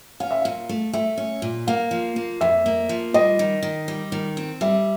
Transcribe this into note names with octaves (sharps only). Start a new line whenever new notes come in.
C#4 F5
E5
A#2 F5
A3
A3 E5
C#4
A#2
A#3 F5
F3
A#3
F2 E5
A#3
F3
G3 D#5
D#3
D#3
G3
D#3
C4
G3 E5